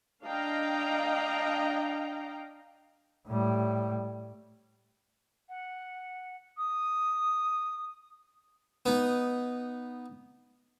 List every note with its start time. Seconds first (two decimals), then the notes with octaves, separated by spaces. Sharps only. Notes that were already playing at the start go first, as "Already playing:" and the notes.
0.24 D4 D#5 F5 G5 A#5
3.28 A2 G3
5.49 F#5
6.57 D#6
8.86 B3 D#4